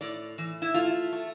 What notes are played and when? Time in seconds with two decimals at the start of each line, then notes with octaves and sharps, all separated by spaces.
0.01 A2 D5
0.38 E3
0.62 E4
0.74 A3 F4
1.12 A3